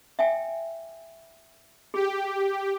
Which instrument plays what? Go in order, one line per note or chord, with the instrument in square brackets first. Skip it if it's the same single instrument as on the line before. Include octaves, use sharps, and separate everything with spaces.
[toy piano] E5 G5 G#5
[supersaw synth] G4 [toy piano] G#4